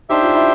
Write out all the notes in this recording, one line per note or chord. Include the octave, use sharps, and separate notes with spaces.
D4 D#4 G4 C5 E5
F4
E4